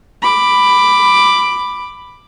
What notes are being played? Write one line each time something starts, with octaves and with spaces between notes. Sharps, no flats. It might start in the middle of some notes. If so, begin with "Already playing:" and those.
B5 D6